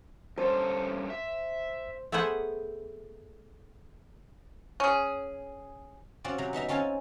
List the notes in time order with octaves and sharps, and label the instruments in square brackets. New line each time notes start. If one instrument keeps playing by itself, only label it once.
[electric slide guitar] G2 C#4 A4 [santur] C5
[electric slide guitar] E5
[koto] A3 B3 G#4 C5 F#5
[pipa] C#4 G#4
[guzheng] C4 C#4 F4 F#4 D5
C3 F#3 A#5
B3 D#4 E5 A#5
C4 C#4 F4 A4 F5 G#5